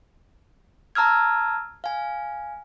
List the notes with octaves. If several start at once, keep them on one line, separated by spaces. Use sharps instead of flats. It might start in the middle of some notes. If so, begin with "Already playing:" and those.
A5 A#5 E6 F6 G#6
F5 G#5